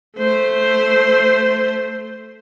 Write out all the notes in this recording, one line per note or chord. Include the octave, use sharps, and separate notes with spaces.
A3 C5